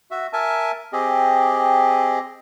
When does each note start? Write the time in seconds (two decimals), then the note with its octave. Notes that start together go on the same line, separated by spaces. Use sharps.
0.11 F#4 E5
0.33 A#4 E5 G#5 A5
0.93 C4 G4 G#4 D#5